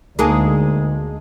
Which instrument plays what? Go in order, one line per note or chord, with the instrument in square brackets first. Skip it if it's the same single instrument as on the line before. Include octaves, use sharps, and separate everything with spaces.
[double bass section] D2 [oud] G#3 A#3 [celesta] D#4 G#5 A5